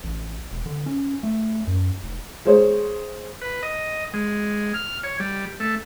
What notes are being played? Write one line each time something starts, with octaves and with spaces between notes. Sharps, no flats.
A1
E1
D3
C#4
A3
F#2
F1
G#3 C5 C#5
B4
D#5
G#3
F6
C#5
G3
A3